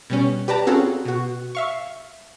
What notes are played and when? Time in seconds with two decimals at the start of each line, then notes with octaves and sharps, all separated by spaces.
0.10 B2 G3 C#4
0.48 G4 B4 D5 A5 A#5
0.67 C4 C#4 F4 F#4 G#4 A4
1.05 B2 F#4
1.55 E5 F5 C#6